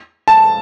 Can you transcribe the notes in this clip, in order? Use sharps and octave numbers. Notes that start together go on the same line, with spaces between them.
A5